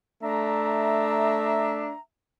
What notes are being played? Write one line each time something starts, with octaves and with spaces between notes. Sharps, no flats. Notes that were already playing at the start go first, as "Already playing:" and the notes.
A3 D4 E5 A#5